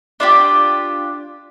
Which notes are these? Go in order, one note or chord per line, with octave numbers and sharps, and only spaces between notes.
D4 F4 G4